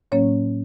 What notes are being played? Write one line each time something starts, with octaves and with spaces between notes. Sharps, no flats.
A2 F#3 A#3 C#4 C#5